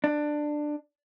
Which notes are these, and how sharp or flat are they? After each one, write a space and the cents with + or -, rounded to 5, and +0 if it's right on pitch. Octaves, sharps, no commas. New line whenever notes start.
D4 +15